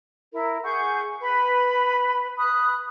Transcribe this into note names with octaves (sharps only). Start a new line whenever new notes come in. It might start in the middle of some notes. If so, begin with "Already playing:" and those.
E4 A#4
G#4 F#5 C#6 G6
B4 B5
B5 D#6 F#6